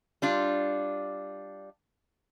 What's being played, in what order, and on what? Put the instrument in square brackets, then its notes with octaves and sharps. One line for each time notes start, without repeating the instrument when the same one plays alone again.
[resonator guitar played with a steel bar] G3 D4 F4